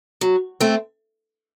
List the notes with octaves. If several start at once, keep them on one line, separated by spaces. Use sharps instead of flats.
F#3
A3 C4